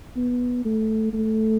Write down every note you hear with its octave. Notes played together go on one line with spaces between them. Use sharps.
B3
A3
A3